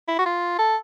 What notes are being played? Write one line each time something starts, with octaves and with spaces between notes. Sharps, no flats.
E4
F#4
F4
A4